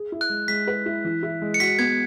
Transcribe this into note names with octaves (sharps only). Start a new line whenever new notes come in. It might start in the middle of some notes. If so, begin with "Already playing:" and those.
Already playing: G#4
E4
F#6
G#3
G#3 B6
B4
E4
E3
E4
G#3
C#7
F#4 B6
B3 G#6